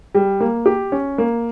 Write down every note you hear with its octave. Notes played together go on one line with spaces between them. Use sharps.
G3
A#3
G4
C#4
A#3